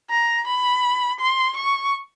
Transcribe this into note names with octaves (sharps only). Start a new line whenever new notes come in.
A#5
B5
C6
C#6